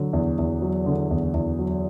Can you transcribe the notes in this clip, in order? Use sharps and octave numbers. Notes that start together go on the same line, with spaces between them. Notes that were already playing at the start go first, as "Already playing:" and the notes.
Already playing: D3 F#3
E2
E2
F#3
D3
E2
E2
F#3